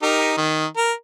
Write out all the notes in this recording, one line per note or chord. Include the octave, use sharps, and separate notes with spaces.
D#4 G4 A#4
D#3
A#4